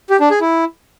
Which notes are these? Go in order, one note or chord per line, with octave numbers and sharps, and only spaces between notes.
G4
D4
G#4
E4